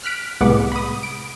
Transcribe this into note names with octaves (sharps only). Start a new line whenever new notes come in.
F6 F#6 B6 D7
C2 A2 G#3 B3 F#5 D6
B5 D#6
D7